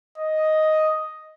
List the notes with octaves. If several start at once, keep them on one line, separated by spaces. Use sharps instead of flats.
D#5